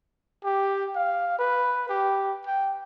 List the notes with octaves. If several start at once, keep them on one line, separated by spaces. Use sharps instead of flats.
G4
F5
B4
G4
G5